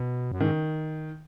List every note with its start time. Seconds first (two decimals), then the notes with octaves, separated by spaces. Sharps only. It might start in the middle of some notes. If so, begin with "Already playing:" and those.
Already playing: B2
0.32 F#2
0.40 G#2 D#3